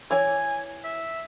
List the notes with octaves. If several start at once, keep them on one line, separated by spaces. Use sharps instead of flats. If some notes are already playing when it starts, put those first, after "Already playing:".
E3 C#5 G#5
E5